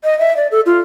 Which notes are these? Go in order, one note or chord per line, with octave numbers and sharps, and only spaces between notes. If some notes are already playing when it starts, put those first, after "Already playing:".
D#5
E5
D5
A4
F4